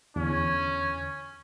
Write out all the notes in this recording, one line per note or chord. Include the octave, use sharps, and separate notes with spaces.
E2 D3 C#4